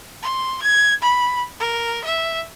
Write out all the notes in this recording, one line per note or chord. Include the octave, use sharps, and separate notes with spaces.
C6
G#6
B5
A#4
E5